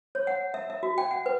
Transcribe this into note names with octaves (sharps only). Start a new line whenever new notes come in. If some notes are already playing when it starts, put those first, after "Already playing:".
C#5
F#5
E5
E5
F#4
G5
F#5
B4